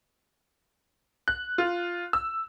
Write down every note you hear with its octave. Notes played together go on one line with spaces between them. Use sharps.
F#6
F4
E6